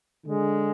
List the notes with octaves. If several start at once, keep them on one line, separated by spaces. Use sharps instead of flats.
D3 G#3